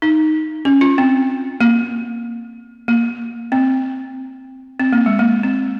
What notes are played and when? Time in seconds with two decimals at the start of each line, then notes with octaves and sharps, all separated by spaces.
0.02 D#4
0.65 C#4
0.81 F4
0.98 C4
1.61 A#3
2.88 A#3
3.52 C4
4.80 C4
4.93 A#3
5.06 G#3
5.19 A#3
5.43 C4